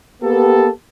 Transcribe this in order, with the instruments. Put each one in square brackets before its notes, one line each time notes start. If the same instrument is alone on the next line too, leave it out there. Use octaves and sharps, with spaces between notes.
[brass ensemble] A#3 B3 G4 A4